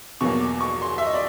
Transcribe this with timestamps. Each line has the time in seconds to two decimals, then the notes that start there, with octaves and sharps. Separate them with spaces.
0.21 E2 B2 F#3 A#3 C#6
0.41 D6
0.61 C#6
0.82 C6
0.98 E5
1.06 D#5
1.13 D5